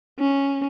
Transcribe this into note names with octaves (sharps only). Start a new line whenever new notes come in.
C#4